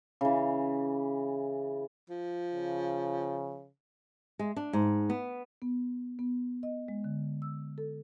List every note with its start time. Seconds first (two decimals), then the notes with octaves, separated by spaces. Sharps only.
0.21 C#3 E3
2.10 F3
2.54 C#3
4.39 G#3
4.56 D4
4.73 G#2
5.10 B3
5.62 B3
6.19 B3
6.63 D#5
6.88 G#3
7.04 D3
7.42 E6
7.78 A4